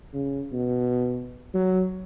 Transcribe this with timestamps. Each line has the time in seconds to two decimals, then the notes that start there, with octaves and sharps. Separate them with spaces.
0.13 C#3
0.52 B2
1.54 F#3